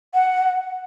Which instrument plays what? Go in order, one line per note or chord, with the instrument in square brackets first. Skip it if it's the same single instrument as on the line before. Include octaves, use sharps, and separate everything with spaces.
[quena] F#5